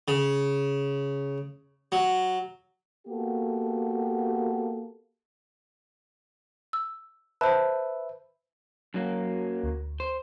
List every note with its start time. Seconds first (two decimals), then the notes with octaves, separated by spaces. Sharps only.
0.08 C#3
1.92 F#3
3.07 A#3 B3 F#4 G4 A4
6.73 E6
7.41 B4 C5 E5 A5
8.94 F#2 F#3 A#3
9.63 D2
10.00 C5